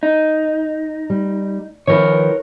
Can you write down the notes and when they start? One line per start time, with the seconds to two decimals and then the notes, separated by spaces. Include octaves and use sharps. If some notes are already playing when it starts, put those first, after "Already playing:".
0.03 D#4
1.10 G3
1.87 D#3 F3 A#4 B4 C#5